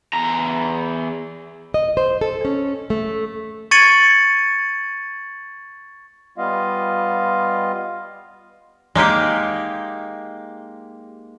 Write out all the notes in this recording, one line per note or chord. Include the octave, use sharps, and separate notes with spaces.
E2 A#5
D#5
C5
A4
C#4
A3
C#6 G#6 A6 C#7 D#7 F#7
G3 B3 F4 D#5 F5
G#3 A#3 D#4 G4